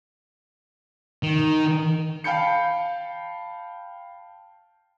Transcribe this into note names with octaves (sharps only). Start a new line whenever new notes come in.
D#3
F5 G5 A5 B5 G6 C#7